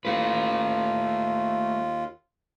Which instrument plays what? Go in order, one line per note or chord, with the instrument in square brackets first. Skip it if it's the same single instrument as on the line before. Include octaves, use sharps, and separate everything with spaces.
[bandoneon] D#2 F4 [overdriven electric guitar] A3 B4